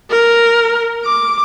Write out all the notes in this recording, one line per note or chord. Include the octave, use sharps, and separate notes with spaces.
A#4
D6